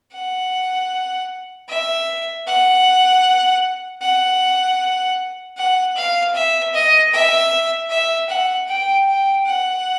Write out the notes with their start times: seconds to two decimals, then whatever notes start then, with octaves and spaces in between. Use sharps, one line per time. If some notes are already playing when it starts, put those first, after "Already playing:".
0.13 F#5
1.69 E5
2.47 F#5
4.02 F#5
5.57 F#5
5.96 F5
6.35 E5
6.74 D#5
7.13 E5
7.90 E5
8.29 F#5
8.68 G5
9.07 G5
9.46 F#5